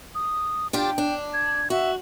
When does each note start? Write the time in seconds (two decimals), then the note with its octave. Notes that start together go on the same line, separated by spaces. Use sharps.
0.15 D#6
0.73 D4 F4 G4 G5
0.98 D4
1.33 G#6
1.70 F#4 E5